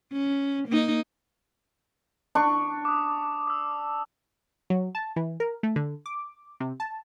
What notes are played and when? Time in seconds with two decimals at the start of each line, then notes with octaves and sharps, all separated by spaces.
0.12 C#4
0.68 A#3 D#4
2.35 D4 C#6
2.85 D6 D#6
3.47 D#6 E6
4.70 F#3
4.95 A5
5.16 E3
5.40 A#4
5.63 A3
5.76 D3
6.06 D6
6.60 C3
6.80 A5